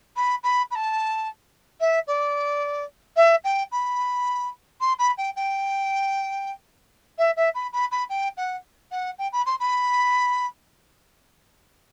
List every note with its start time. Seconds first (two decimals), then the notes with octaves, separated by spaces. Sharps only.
0.16 B5
0.43 B5
0.71 B5
0.75 A5
1.80 E5
2.07 D5
3.16 E5
3.44 G5
3.71 B5
4.80 C6
4.99 B5
5.17 G5
5.36 G5
7.18 E5
7.36 E5
7.54 B5
7.72 B5
7.91 B5
8.09 G5
8.37 F#5
8.91 F#5
9.18 G5
9.32 B5
9.46 C6
9.59 B5